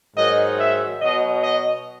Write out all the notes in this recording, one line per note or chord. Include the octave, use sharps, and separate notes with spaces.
G#2 D#3 F#3 D#5
E5
B2 F#3 D#5
D#5